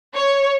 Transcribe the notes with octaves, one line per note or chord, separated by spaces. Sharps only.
C#5